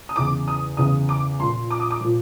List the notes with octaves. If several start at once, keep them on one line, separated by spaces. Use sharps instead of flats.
D#6
E2 C#3 E3 D6
D#6
E2 C#3 E3 D#6
D6
A#2 F3 C6
D6
D#6
D6
A#2 F3